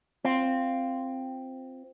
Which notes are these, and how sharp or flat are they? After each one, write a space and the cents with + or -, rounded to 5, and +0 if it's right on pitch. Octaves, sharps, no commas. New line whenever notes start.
C4 +0 F4 +0